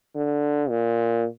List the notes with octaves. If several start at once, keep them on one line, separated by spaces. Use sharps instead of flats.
D3
A#2